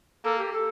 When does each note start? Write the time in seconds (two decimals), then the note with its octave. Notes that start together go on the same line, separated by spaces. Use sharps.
0.24 A#3 A4
0.38 G4
0.53 A4